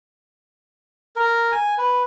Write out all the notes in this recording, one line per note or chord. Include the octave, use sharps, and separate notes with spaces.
A#4
G#5
B4